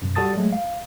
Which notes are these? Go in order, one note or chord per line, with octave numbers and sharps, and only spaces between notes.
F#2 B2
G3 F#4 A4 A5 D#6 A6
F#3 G#3 A3
F5